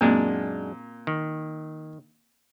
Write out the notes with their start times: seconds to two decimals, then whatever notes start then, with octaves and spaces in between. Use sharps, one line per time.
0.01 F#2 A#2 G#3 C4 D4
1.07 D#3